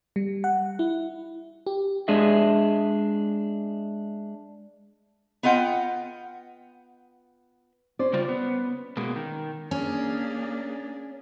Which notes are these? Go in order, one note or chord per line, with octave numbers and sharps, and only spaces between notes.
G3
F#5
E4
G4
G#3 D4 G#4 D#5 E5
B3 F4 D#5 F#5 G5
C#4 C5 D5
C#3 G3 F4
B3
B2 G#3 A#3
D#3
A#3 C#4 D4 G#4